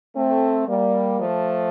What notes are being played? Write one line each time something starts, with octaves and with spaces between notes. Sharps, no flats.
A3 C4
G3 A#3
F3 A3